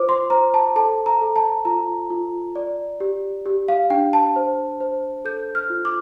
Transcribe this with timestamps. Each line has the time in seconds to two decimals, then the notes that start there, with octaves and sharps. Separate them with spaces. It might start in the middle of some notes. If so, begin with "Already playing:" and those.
Already playing: F4 C5 D6
0.09 C6
0.30 C5 A#5
0.54 A5
0.76 A4 A5
1.06 A#5
1.21 A4
1.36 A5
1.65 F4 A#5
2.10 F4
2.56 D5
3.00 G4
3.46 G4
3.68 F5
3.90 D4 G5
4.13 A5
4.36 C5
4.80 C5
5.25 A4 G6
5.55 F6
5.70 F4
5.85 D6